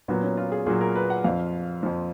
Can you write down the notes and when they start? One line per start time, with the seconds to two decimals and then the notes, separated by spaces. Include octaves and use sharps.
0.08 A#2 F#3 B3
0.23 C#4
0.37 F4
0.52 G#4
0.66 A#2 F#3 G#4
0.81 A#4
0.96 B4
1.10 F#5
1.24 F2 F3 F5
1.83 F2 F3